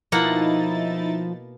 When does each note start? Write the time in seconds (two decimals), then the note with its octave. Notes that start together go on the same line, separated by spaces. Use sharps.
0.12 B2 F3 A#3 D#4 E4 F#5 A6